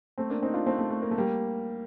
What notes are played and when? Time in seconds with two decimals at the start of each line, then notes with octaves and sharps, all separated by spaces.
0.18 A3 C4
0.30 A#3 D4
0.42 C4 D#4
0.54 D4 F4
0.66 A3 C4
0.79 A3
0.91 A3
1.02 A#3
1.11 A3
1.18 G3 A#3